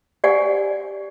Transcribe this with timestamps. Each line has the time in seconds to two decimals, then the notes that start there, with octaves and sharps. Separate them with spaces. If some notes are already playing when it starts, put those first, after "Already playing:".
0.24 G4 D5 F#5 G#5